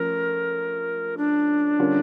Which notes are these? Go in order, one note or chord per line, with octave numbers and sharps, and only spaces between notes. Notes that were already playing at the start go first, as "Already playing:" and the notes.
Already playing: F3 A3 C#4 A#4
D4
D3 G3 C#4 F4 A#4